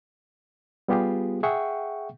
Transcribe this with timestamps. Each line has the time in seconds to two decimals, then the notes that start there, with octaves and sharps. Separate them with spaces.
0.88 G3 B3 F4 G4 G#4
1.43 G#4 E5 F#5 G5 C#6